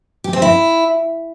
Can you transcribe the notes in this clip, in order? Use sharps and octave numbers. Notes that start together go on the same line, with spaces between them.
G4
C4
E4